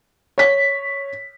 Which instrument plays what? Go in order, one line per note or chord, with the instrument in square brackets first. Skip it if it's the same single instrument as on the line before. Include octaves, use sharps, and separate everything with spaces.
[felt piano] C#5 B6